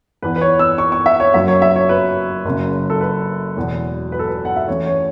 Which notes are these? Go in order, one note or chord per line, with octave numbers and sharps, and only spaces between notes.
E2 E3 B3 B4
B4
C#5
E6
C#6
C#6
E5
C#5
F#1 F#2 F#3 E5
C#5
E5
C#5
B4
F#1 F#2 C#3
A4
B4
E1 E2 B2 F#3
B4
A4
B4
F#5
E5
E2 E3 A3 C#4 C#5
C#5